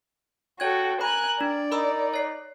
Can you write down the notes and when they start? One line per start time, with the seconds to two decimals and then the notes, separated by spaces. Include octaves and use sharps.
0.60 F#4 A4 C#5 G5 G#6
1.01 A#4 G#5 B5 F#6
1.41 D4 D5
1.72 D#4 A#4 B5 E6
2.14 C#5 C7